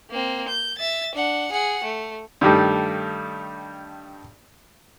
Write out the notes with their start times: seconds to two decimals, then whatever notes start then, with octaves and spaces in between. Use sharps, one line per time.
0.11 A#3 C4
0.48 G6
0.78 E5 A6
1.15 D4 F#5
1.52 G#4 F#5
1.84 A3
2.41 G2 D#3 G3 A3